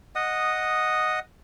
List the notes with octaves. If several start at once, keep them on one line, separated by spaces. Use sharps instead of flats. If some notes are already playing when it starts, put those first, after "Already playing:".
D#5 F#5 D#6